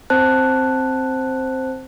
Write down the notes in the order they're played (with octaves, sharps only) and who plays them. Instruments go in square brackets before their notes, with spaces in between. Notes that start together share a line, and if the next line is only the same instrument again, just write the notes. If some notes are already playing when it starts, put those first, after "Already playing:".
[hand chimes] C4 C5 A5 F#6